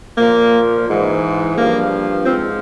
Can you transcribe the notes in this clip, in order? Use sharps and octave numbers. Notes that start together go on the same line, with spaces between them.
A#2 F3 A#3
G#2 E3
G2 F3 A#3
G#2 F3 C4